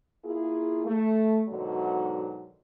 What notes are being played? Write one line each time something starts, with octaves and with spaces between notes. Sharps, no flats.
A#3 E4 F4 G#4
A3
G#2 B2 D3 D#3 F#3